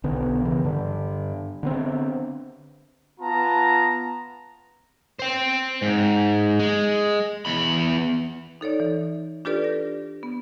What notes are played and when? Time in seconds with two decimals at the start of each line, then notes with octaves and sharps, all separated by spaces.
0.04 B1 D3 B3
0.41 C#3 E3
0.65 G2 D3
1.63 D3 B3 C4
3.20 B3 F4 A5 A#5
5.19 C5 G5
5.82 G#2
6.60 G#3
7.45 E2 B5
8.61 D#4 A4 C#5 D5
8.80 E3
9.45 D4 F4 G4 A4 B4 D5
9.64 A#6
10.23 B3